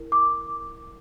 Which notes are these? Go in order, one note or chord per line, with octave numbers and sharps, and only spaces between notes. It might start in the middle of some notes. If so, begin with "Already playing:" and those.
Already playing: E4 A#4
D6